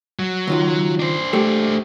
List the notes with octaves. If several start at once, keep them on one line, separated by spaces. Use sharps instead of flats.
F#3
C#2 D#3 F4
D4 C5
A3 G4